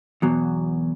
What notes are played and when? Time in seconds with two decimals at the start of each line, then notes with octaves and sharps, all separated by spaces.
0.22 E2 B2 F#3